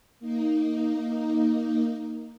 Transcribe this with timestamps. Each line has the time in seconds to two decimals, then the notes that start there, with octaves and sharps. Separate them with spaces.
0.20 A#3 D#4